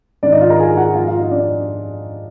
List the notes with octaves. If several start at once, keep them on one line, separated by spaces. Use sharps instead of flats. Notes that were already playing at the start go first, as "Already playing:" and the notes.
G#2 D#3 D4 D5
D#4 D#5
F4 F5
A#4 A#5
G#4 G#5
F#4 F#5
G#2 F3 F4 F5
F4 F5
D#4 D#5
D4 D5